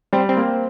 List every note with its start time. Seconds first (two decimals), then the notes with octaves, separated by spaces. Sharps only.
0.13 G3 C4
0.29 C4
0.37 A#3